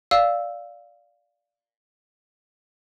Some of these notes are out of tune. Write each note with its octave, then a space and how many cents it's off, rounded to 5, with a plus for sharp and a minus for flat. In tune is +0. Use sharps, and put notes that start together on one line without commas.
D5 -5 F5 +0 E6 -5